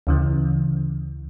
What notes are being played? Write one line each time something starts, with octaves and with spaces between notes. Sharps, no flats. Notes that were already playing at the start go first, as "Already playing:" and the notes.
D2 C#3 E3